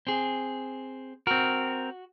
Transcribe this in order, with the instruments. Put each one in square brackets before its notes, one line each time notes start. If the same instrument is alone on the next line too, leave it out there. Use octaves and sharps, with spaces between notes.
[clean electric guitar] C4 G#4
[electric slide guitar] C4 A#4 [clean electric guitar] F#4